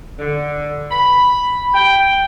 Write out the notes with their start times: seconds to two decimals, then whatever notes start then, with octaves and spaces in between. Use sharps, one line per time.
0.19 D3
0.92 B5
1.74 G5